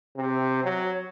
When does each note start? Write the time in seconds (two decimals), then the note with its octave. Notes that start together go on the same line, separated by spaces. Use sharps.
0.17 C3
0.64 F#3